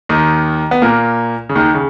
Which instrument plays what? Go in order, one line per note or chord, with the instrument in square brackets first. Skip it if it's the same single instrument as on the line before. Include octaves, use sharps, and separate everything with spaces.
[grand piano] D#2 D#3
B3
A#2 A#3
C#3
D#2 D#3
C#3